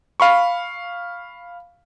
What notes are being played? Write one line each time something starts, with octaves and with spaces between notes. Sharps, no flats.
F5 B5 C#6